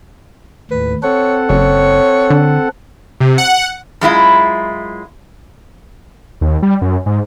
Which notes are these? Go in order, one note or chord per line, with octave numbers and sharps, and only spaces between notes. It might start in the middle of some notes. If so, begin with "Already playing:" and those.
D#2 A2 B4
C4 A4 C#5 F#5
F#1 C#5
D3
C3
F#5
F#2 G#3 E4 F4
D#2
G3
F#2
G#2